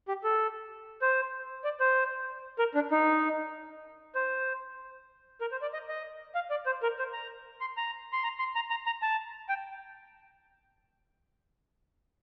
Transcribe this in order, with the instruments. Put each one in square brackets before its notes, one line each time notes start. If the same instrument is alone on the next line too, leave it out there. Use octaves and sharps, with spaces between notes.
[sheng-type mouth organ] G4
A4
C5
D5
C5
A#4
D4
D#4
C5
A#4
C5
D5
D#5
D#5
F5
D5
C5
A#4
C5
A#5
C6
A#5
C6
A#5
C6
A#5
A#5
A#5
A5
G5